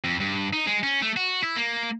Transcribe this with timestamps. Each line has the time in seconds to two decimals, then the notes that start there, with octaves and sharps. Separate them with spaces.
0.04 F2
0.20 G2
0.53 D#4
0.67 G#3
0.83 C#4
1.02 A3
1.17 F#4
1.43 E4
1.56 A#3